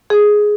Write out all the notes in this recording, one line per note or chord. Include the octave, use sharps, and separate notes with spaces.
G#4